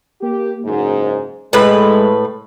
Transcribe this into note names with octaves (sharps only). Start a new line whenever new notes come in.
A#3 G4
F#1 G#2
A2 G#3 B4